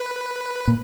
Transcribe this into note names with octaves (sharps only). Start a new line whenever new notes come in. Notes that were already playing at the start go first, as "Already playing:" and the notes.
Already playing: B4
A#2